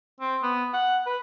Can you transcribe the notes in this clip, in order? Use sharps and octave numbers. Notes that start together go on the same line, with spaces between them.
C4
B3
F#5
B4